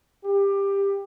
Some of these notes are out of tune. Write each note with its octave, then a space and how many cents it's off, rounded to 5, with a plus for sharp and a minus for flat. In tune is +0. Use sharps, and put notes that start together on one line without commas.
G4 +20